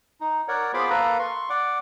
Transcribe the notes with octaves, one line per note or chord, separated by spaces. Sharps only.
D#4
A#4 C#5 D5 F#5
B3 F4 G#4 C5 B5 D6
A#3 A4 B4 F5 A#5
C6 C#6
D5 F#5 D6